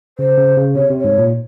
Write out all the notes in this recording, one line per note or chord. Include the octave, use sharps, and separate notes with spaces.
C#3 C5
C#3
C#3
C3 C#5
C3
G#2 C#5
A#2